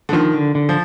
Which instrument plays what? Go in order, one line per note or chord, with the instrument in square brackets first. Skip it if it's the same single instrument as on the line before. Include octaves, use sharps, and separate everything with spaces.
[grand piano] D3
[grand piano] D#3 [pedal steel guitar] F3
[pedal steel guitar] D3
D3
[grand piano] F3